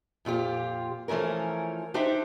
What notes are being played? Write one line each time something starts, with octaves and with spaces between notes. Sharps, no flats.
F2 A#2 F4 G4
E3 F3 A3 C#4 A#4
D4 D#4 G4 C5 D#5 E5